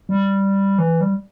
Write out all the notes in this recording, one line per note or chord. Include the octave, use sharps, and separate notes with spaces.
G3
E3
G3